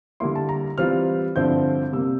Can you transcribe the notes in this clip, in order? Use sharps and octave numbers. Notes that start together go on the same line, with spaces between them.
D3 G3 A#3 E4 C6
A5
A#5
E3 G3 C4 F4 F6
G2 D3 F3 C4 E4 G6
C3 G3 A#3 E6